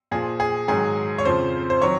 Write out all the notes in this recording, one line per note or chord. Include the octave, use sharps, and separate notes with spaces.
A#2 F3 G#4
G#4
G#2 D#3 F#3 G#4
C#5
F2 C#3 F3 C5
C5
D#3 F#3 C#5